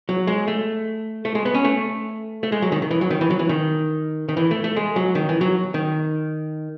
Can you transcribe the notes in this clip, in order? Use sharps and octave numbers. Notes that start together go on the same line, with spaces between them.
F#3
G#3
A3
A3
G#3
B3
C#4
A3
A3
G#3
F#3
D#3
D#3
E3
F#3
D#3
E3
F#3
E3
D#3
D#3
E3
A3
A3
G#3
F#3
D#3
E3
F#3
D#3